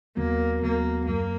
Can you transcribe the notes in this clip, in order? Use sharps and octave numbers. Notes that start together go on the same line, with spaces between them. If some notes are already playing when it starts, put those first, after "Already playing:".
D#2 C#3 F#3 A#3 B3 F#4
D#2 C#3 F#3 A#3 B3 F#4
F#2 C#3 F#3 A#3